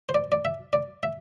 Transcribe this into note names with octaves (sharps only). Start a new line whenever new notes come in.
C5
D5
D5
E5
D5
E5